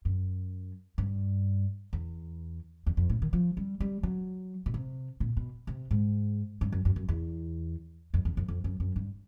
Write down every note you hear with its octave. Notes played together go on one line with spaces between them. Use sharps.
F#2
G2
E2
E2
F2
A2
D#3
F3
G3
G3
F#3
B2
C3
A#2
B2
C3
G#2
G2
F#2
F#2
F#2
E2
F2
E2
F2
F2
F#2
F#2
G2